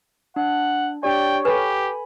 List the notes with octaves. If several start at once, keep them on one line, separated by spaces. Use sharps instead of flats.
D4 F#5
D4 G4 C#5 D5 G5
G4 A4 B4 G#5 B5